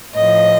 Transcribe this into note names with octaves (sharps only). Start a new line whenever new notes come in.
A2 F3 D#5